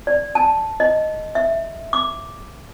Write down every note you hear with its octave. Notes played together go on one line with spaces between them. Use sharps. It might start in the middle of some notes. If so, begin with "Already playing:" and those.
D5
A5
D#5
E5
D6